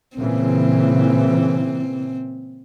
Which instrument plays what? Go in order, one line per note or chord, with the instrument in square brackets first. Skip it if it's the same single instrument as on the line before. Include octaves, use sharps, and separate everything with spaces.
[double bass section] A#2 C#3 E3 [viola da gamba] C4